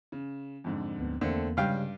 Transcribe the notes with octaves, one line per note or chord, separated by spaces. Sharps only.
C#3
F2 G#2 D3
D2 B3
E2 D3 A3 A#3 C4
G2 C#3 G3 G#3 C#4 F5 G5